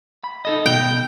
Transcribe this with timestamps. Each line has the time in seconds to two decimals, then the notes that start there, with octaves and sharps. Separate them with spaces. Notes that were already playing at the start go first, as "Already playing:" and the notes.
0.24 B5
0.45 D#4 A4 D#5
0.66 B2 G5